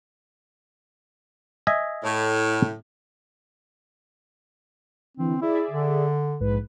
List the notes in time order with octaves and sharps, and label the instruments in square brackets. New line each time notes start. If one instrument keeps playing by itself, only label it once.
[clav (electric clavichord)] D#5 E5 G#5
[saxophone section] A2
[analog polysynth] D3 E3 [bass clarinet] C4
[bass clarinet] E4 [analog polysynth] G#4 D5 E5
[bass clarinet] D3
[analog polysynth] A#1 G#2 B4